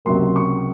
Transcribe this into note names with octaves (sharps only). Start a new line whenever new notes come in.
C#2 C3 F#3 A#3 C6
C#6